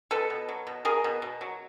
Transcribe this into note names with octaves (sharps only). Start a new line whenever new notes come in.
B2 A4 B4
B2
F#3
B2
B2 G#4 A#4
B2
B2
F#3